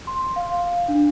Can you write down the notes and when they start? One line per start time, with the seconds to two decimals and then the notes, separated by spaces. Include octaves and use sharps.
0.07 C6
0.36 F5
0.88 D4